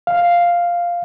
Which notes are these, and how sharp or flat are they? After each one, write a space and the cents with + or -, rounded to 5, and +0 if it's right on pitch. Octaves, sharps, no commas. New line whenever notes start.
F5 +0